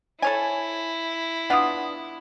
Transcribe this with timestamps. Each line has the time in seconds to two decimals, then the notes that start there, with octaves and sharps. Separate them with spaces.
0.22 E4 A4 C#5 G#5
1.50 B3 D4 F4 F#5 D#6